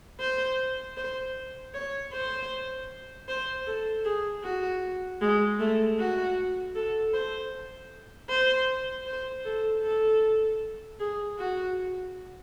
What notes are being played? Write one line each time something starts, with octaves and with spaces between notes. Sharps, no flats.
C5
C5
C#5
C5
C5
A4
G#4
F#4
G#3
A3
F#4
A4
C5
C5
C5
A4
A4
G#4
F#4